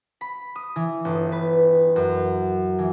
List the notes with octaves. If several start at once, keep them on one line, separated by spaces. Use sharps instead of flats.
B5
D#6
E3
G1
B4
F#2
E3